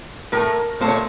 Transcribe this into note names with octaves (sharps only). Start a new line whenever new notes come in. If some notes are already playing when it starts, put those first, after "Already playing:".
A2 A3 A#4
A#2 A3 C5
C#5